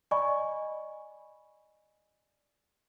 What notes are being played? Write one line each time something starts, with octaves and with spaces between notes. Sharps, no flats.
D5 D#5 G#5 B5 C#6